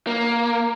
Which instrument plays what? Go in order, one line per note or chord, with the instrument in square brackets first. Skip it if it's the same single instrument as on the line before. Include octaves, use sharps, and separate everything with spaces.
[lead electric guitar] A#3